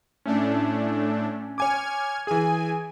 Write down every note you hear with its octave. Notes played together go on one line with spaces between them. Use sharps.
A2 A3 C#4 D4
C#5 G#5 D6 F6 G#6
E3 G#4 G#5